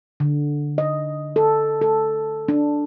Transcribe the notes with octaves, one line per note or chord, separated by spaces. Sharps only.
D3
D#5
A4
A4
D4